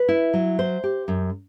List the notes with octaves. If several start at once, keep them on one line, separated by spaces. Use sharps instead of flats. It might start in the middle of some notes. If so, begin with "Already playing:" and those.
Already playing: B4
E4
F#3
C5
G4
F#2